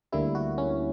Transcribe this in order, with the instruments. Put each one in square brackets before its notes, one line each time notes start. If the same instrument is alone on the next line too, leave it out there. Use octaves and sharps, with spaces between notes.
[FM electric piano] D2 D3 G3 A#3 E4
F#4
C#4